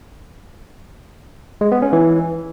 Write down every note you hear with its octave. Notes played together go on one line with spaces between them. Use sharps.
G#3
B3
C#4
E3